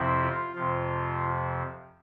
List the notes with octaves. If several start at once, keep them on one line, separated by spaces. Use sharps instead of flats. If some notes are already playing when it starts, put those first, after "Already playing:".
Already playing: F2 C3 F3 C4 E4
F4
F2 C3 F3 F4